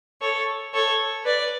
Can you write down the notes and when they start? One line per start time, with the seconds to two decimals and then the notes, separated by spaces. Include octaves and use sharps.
0.21 A4 C#5
0.73 A4 C#5
1.24 B4 D5